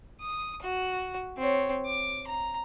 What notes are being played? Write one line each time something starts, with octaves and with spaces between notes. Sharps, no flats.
D#6
F#4
C4 C#5
D6
A#5